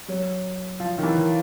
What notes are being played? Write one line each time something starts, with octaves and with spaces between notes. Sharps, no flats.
F#3
F3
D#3
E3
D#3